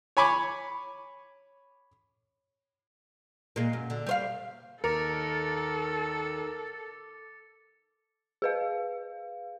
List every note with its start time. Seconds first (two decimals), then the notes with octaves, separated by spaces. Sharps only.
0.17 C#5 G#5 B5 C#6 D6
3.56 A#2 G#3
3.73 F#2
3.90 D3
4.07 G3 C5 F5
4.84 D#2 A4 A#4 D6 A6 C#7
8.42 G#4 B4 F5